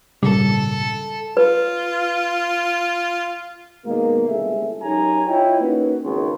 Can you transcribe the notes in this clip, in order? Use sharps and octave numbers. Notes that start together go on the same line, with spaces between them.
G#1 A#2 C#3 G3 A4
F4 B4
B2 D#3 G#3 A#3
G1 C2 G#3 G#4 A4 E5
F#2 D#4 G4 C#5 G#5 A#5
E4 F4 C#5 D#5 G5
A#3 C#4 D#4 F#4 B4
G#1 C#2